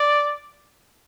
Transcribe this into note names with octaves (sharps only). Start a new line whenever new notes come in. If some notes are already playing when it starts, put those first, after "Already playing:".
Already playing: D5